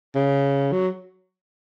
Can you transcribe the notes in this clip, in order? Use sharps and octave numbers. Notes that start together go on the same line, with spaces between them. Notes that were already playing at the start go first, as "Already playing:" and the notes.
C#3
F#3